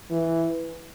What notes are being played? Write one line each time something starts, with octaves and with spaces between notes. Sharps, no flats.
E3